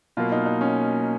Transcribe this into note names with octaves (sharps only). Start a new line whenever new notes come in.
B2 F#3 A#3 F4
D#4
D#4
C#4